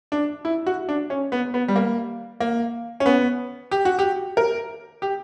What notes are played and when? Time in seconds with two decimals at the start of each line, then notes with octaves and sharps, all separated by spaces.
0.12 D4
0.45 E4
0.67 F#4
0.89 D4
1.10 C#4
1.32 B3
1.54 B3
1.68 G3
1.76 A#3
2.40 A#3
3.00 C#4
3.06 B3
3.71 G4
3.85 F#4
3.99 G4
4.37 A#4
5.02 G4